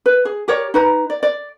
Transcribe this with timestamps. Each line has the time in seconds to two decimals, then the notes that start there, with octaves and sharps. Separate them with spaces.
0.06 B4
0.25 G#4
0.48 G4 A#4 C#5 D5
0.74 D#4 B4 A#5
1.10 D5
1.23 D5